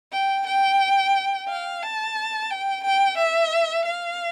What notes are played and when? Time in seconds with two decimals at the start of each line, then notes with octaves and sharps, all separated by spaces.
0.12 G5
0.47 G5
1.49 F5
1.83 A5
2.50 G5
2.85 G5
3.18 E5
3.86 F5